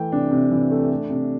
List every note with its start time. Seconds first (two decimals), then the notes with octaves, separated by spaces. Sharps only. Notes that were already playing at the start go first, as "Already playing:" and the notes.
Already playing: E3 A3 G5
0.12 C3 D4
0.31 C3
0.51 E3
0.71 A3
0.90 A3
1.10 C3